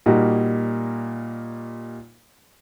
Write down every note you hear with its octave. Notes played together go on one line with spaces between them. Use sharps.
A#2 G3 A#3 D#4 F#4